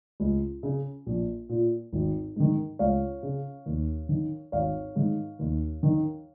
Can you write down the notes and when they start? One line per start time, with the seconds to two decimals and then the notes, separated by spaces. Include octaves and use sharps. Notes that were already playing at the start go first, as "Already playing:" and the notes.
0.20 C#2
0.63 C#3
1.06 A#1
1.49 A#2
1.93 G#1
2.36 G#2 D#3
2.79 C#2 C#5 F5
3.23 C#3
3.66 D#2
4.09 D#3
4.52 G#1 C#5 F5
4.96 G#2 D#3
5.39 D#2
5.83 D#3